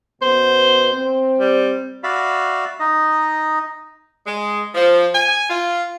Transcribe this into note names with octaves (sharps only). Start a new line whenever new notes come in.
F#2 B2 B3 C5
C4
G3
F#4 D5 E5 F5 B5
D#4 D#5
G#3
F3
G#5
F4